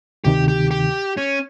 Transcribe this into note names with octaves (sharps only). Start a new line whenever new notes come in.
D2 C3 D#3 G4
G4
G4
C#4